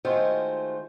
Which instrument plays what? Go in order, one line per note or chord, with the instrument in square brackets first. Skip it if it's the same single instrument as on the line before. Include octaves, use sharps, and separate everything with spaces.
[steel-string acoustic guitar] D#3 G#3 A3 F4 F#4 C5